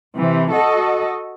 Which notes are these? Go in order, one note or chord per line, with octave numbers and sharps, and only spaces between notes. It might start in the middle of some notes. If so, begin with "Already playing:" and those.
C3 E3
F#4 A4 D#5